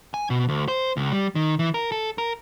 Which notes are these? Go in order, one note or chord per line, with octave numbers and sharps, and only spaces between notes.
G#5
B2
D2
C5
C#2
G3
D#3
E3
A#4
A4
A#4